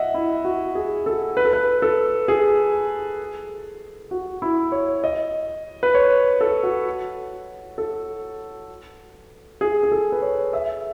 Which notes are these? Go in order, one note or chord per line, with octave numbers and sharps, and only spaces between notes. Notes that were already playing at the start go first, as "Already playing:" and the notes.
Already playing: D#5 E5 F#5
E4
F#4
G#4
A4
B4
A4
B4
A4
G#4
F#4
E4
C#5
D#5
B4
C#5
A4
F#4
A4
G#4
G#4
A4
B4
C#5
E5